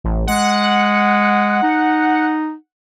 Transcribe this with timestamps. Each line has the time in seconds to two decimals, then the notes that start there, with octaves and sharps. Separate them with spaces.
0.04 A1
0.27 G#3 F#5
1.63 D#4